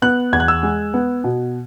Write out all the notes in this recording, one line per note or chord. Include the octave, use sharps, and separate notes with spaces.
B3 F#6
E2 G#6
F#6
E6
G#3
B3
B2